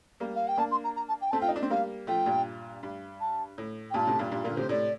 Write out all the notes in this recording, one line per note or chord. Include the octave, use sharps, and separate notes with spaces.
G3 A#3
F5
G5
A#3 D4 A5
C6
A#5
A#5
A5
G5
A3 C4 A5
F4 G5
D#4
D4
C4
G3 A#3 F5
F3 A3 G5
G2 A#2
G2
A5
A2
G5
G2 A#2 A5
A2 C3
G2 A#2
G2 A#2
A#2 D3 A#4
A2 C3 C5
A2 C3 D5